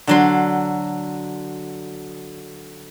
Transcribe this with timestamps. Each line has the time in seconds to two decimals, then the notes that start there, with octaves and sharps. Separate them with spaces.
0.07 D3 F#3 C6